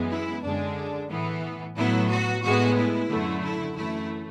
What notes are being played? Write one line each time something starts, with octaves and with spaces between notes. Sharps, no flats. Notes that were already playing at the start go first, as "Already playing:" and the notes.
Already playing: F#2 E3 G#3 B3
E4
F#2 D3 G#3 D4
A2 E3 B3
A2 F#3 B3 E4
F#4
A2 G#3 B3 F#4
E4
F#2 D3 F#3 A3
E4
F#2 E3 A3 E4